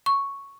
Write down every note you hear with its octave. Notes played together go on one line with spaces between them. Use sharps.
C#6